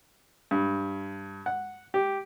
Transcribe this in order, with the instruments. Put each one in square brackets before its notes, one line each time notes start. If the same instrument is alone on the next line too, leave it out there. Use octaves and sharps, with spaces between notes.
[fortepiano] G2
F#5
G4